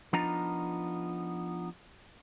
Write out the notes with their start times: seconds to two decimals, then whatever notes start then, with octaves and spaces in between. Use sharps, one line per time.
0.13 F3 B3 D4 D#4 F4 A#5